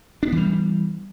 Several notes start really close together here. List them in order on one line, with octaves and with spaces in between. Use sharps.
D4 B3 E3 G3